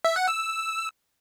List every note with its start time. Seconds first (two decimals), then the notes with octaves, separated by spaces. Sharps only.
0.05 E5
0.16 F#5
0.28 E6